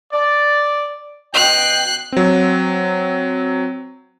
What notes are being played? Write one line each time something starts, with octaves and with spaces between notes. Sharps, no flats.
D5
B2 D#5 G5 F#6 C7
F#3 C4